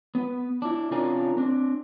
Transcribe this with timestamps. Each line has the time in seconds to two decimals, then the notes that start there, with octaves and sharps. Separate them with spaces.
0.15 B3 B4
0.62 D4 E4
0.91 C3 C#4 D4 F4 A#4 G#5
1.37 C4 D4